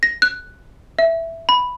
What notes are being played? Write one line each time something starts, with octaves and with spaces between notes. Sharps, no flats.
A#6
F#6
E5
B5